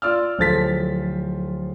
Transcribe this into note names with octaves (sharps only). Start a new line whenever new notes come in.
F4 D5 E6 F6
D1 F3 A4 A6 B6